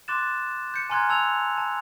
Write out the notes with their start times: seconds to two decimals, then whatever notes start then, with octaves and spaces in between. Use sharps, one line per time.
0.08 C6 D6 F#6 A6 E7
0.74 G6 C#7
0.90 G#5 A#5 C6 F6 F#6 G#6
1.09 A5 E6 G#6 F7
1.58 A5